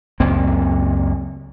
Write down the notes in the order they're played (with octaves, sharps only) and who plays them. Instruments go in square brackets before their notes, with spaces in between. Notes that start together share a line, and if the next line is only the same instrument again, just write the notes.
[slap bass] C#2 F#2 A#3 C4